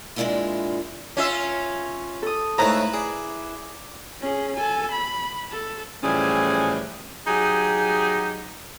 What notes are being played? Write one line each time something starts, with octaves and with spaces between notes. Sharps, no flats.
A#2 G#3 A#3 D4 E4 F4
C#4 F4 E5
A4 D#6
G#2 C#3 A3 E4 B4 A#5
G#4 D5
C#4 G#4
A4 G#5
B5
A4
A2 E3 F3 G3 C#4 G#4
F#3 D#4 G4 G#4